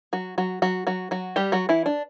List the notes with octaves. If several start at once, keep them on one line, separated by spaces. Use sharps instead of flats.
F#3 F#4
F#3 F#4
F#3 F#4
F#3 F#4
F#3 F#4
G3 G4
F#3 F#4
E3 E4
D4